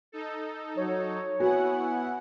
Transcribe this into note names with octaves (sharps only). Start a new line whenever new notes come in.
D#4 A4
F#3 C#5
B3 E4 F#4 F#5 G#5